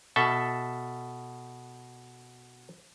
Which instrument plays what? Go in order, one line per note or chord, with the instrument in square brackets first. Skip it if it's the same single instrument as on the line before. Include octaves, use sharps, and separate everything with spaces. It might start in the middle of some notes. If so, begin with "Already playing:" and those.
[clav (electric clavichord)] B2 A4 E5 A5